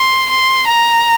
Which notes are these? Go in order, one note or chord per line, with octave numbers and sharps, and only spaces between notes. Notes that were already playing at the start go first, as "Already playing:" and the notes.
Already playing: C6
C6
A#5